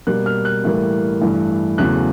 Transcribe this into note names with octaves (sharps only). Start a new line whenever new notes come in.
B2 G3 A#3 F#6
F6
F#6
A2 E3 G3 A#3
G2 E3 A3
E2 C#3 F#3 A3 F#6